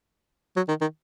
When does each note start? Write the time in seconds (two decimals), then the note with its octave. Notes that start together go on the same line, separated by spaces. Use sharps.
0.56 F#3
0.68 D#3
0.81 D#3